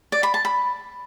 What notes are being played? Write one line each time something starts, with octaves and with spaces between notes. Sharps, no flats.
D5
B5
A5
B5